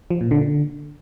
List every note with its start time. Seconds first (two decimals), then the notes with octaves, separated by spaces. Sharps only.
0.10 F3
0.21 A#2
0.31 D3
0.41 D3